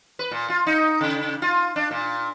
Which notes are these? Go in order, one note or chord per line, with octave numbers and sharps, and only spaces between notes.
B4
A#2
F4
D#4
C#3
F4
D4
A#2